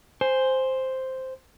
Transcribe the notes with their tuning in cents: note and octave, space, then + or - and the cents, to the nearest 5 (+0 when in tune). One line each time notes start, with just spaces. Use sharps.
C5 +0 G#5 -5